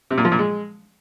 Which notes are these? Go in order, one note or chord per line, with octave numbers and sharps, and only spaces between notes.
C3
A#2
F3
A#2
G#3